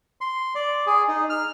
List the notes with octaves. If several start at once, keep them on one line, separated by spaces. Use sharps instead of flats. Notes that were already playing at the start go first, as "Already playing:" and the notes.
C6
D5
G#4
D#4
F6